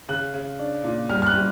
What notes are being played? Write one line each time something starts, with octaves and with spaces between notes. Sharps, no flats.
C#3 F#6
C#3
D4
A#2
G3 F6
F6
F#6
G3